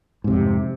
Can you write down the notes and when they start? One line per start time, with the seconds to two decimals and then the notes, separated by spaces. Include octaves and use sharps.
0.24 G#2
0.27 C3
0.30 F2